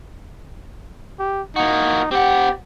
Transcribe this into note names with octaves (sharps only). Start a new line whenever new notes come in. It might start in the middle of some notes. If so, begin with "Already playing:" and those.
G4
A#3 D#4 F#4
C4 G4 F#5